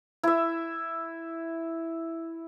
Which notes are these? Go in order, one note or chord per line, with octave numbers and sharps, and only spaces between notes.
E4 E5